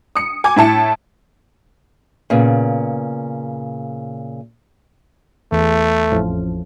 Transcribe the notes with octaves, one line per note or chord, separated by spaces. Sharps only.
D#6 C#7
G#5 D6 G#6
A2 E4 A5 C#7
A#2 C#3 B3
E2 A3
A1 F2